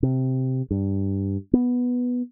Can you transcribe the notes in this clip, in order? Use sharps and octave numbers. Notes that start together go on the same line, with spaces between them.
C3
G2
B3